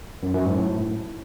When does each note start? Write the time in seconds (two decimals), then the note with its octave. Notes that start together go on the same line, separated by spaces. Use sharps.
0.23 F#2
0.34 F#2
0.45 G#2
0.57 A2